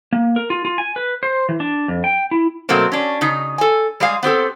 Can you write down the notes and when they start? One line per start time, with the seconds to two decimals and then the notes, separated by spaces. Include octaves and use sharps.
0.13 A#3
0.36 A#4
0.50 F4
0.65 F4
0.78 G#5
0.96 B4
1.23 C5
1.49 E3
1.60 D4
1.88 F2
2.04 G5
2.31 E4
2.69 B2 F#3 A3 A#3 C4
2.92 C#4 D4
3.21 C#3 D#4
3.58 A4 G#5
4.00 G3 G#3 G#4 F5
4.23 B3 C4 G4 A4